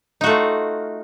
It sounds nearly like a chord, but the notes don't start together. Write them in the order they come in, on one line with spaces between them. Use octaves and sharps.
D#4 F#4 A3 F4